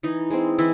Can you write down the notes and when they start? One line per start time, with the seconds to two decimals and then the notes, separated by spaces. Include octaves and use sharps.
0.03 E3 D#4
0.30 G#3 C4
0.58 E3 E4